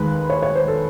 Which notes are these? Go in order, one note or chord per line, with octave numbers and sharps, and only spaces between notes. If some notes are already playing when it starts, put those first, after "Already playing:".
Already playing: D#2 D#3 G#3 B4
C#5
C#5
C5
A4